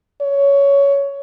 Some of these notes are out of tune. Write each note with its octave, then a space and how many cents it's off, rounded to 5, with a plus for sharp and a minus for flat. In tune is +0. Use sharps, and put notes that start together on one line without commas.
C#5 +15